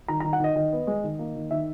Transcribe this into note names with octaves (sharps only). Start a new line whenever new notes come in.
D#3 A#5
D#3 A#5
F#5
D#3 D#5
D#3 D#5
B3
G#3
D#3
A#3
D#3
D#3 E5